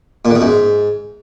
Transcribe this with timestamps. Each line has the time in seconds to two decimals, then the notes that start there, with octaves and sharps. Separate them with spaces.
0.25 A#2
0.30 D3
0.36 B2
0.41 F#2
0.46 G#2